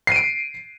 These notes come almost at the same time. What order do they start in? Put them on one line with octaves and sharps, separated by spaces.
C7 D#7 D7